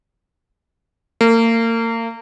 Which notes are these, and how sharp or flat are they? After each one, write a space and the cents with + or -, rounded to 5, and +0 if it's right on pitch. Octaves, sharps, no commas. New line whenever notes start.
A#3 -35